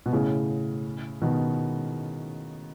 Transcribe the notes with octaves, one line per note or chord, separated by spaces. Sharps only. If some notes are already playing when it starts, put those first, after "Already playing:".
B2
A2 C#3
B2 D#3